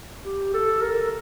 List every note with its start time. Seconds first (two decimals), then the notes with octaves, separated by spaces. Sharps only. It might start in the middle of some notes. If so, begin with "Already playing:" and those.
0.24 G4
0.54 A4
0.82 A#4